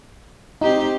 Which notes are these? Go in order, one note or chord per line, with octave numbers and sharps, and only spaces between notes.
C4 D#4 G4